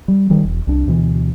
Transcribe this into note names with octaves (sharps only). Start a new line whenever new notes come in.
G3
D#3 G3 G#3
E1
C2 D4
D2 B2 E3